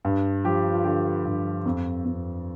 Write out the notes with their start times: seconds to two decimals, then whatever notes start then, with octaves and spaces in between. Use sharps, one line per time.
0.05 G2
0.44 F3 G4
0.74 F4
0.84 D3 G4
1.25 G2
1.66 F2
2.05 F2